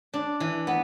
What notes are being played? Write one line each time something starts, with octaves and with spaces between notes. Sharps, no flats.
D4
E3
B3